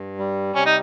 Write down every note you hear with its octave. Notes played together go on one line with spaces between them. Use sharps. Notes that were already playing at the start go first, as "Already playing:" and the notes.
Already playing: G2
G3
C3 C#4
D#4